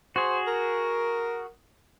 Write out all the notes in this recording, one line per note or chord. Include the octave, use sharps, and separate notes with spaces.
F#4 G#4 C5
A#4